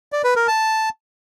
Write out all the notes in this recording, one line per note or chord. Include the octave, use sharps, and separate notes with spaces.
D5
B4
A#4
A5